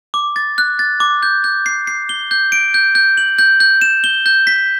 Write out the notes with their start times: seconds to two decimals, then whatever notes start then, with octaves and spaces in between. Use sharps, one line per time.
0.14 D6
0.36 A6
0.58 F#6
0.79 A6
1.00 D6
1.23 G6
1.44 G6
1.66 C7
1.87 C7
2.09 G7
2.31 G6
2.52 D7
2.74 G6
2.95 G6
3.17 F#7
3.39 G6
3.60 G6
3.81 E7
4.04 G7
4.26 G6
4.47 B6